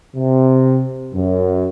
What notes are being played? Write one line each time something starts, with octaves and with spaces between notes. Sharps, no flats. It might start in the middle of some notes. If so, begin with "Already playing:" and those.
C3
F#2